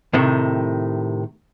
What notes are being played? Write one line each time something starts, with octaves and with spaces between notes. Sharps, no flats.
A2 C3 D#3